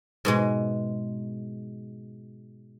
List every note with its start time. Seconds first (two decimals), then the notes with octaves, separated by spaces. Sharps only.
0.25 G#2 B2 G#3